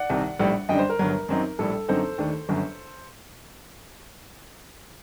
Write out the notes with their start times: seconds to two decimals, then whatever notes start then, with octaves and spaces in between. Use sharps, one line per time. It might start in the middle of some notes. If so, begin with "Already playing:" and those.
Already playing: D5 F#5
0.09 C2 C3 D#3
0.39 A#1 A2 G3
0.69 F#2 D3 G3 D4 D#5 G5
0.79 C5
0.89 A#4
0.99 G1 G2 F#3
1.29 F#2 F#3 C4 D#4
1.59 A#1 A2 G3 A4
1.88 F#2 D3 F#3 C4 D#4 A4 C5
2.18 D#2 D#3 A3 D4
2.49 G1 F#2 D3 F#3